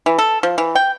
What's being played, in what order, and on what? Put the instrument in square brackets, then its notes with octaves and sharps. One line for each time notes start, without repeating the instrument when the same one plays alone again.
[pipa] E3
A4
F3
E3
G5